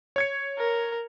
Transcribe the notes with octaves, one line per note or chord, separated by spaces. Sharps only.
C#5 G#6 C#7
A#4